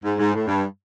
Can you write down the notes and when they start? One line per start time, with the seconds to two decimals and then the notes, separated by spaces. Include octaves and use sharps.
0.04 G#2
0.19 G#2
0.33 A2
0.48 G2